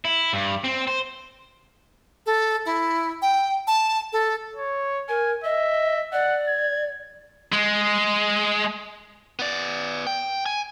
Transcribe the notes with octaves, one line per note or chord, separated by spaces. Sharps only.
E4
G2
C4
C5
A4
E4
G5
A5
A4
C#5
A#4 G#5
D#5 E5
D5 F#5
G#6
G#3
B3 D5
G5
G#5